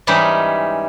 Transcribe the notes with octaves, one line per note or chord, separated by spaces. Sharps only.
G#2 E3 G3 C#4 D#4